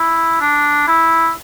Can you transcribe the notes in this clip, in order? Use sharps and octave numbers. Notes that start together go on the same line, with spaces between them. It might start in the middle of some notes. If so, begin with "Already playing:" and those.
Already playing: E4
D4
E4